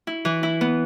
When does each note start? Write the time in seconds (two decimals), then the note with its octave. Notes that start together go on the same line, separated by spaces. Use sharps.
0.07 E4
0.25 E3
0.43 E4
0.61 B3